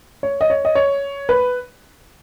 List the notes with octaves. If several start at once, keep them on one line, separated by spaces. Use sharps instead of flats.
C#5
D#5
C#5
D#5
C#5
B4